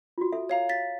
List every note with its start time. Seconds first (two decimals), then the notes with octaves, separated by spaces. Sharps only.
0.18 F4 F#4
0.32 A4 E5
0.49 C#5 F5 A#5
0.69 A6 B6